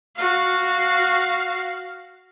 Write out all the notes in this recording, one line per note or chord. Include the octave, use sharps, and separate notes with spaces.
F#4 F5